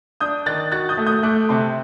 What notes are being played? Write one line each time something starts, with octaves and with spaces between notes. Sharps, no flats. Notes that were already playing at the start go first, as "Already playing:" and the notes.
D4 D#6 G6
D#3 F#6 A6
F#4 F#6 A6
D#6 G6
A3
D#6 G6
A3 D6 F#6
C3 A5 C6